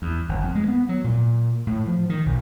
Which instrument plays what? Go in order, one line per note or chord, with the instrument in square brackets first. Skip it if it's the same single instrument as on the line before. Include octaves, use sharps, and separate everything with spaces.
[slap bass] E2
G1
F2
G#3
B3
F#3
A#2
A2
F3
D#3
B1